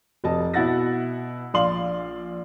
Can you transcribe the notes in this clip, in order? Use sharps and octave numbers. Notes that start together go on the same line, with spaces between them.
F1 D#5 A5
B2 E4 F#5 A6 A#6
A#1 D5 F5 C6 F#7